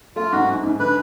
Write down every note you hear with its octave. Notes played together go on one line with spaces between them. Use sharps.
A3 F4
G#2 F#4
G#2
G#2
D3 B4